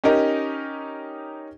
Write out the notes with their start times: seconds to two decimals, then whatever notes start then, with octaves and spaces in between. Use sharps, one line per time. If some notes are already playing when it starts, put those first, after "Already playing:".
0.04 C#4 D#4 G4 A#4 D#5